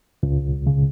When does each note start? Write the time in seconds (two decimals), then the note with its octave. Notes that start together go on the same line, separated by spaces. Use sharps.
0.23 C#2
0.67 C#3